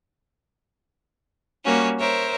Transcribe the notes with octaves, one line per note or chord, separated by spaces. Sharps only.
G3 A#3 C#4 F#4
A#4 C5 C#5 E5